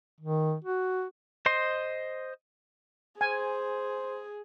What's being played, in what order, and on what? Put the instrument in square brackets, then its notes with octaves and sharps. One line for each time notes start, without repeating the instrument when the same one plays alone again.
[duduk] D#3
F#4
[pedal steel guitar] C5 D#5 C6
[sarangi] G#4 [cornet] C5 [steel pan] G#5